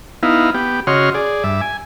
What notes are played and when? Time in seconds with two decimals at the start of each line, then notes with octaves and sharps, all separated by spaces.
0.23 B3 D#4 E4 F5
0.54 B3 G4
0.87 C#3 F#4 C#5 D#5 C6 F6
1.14 G#4 D5
1.44 G2 E5 D6
1.61 G#5